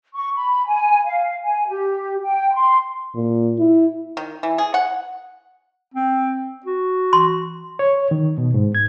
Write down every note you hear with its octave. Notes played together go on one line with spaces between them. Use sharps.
C#6
B5
G#5
F5
G#5
G4
G5
C6
A#2
E4
D#3
E3
G#4
F#5
C4
F#4
C6
C#5
D#3
B2
G#2
G#6